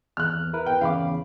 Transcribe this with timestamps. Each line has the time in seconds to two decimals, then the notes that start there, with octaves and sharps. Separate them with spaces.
0.17 E2 F6 F#6
0.53 E4 A#4 B4
0.66 G5
0.81 E2 C#3 F5 B5 D6